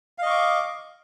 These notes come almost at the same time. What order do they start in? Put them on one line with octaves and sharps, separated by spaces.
F5 D#5 C#6 D6